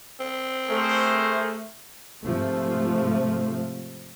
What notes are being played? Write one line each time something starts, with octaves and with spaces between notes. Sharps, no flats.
C4
A3 G#4 A#4 C5
G#2 C3 F3 A3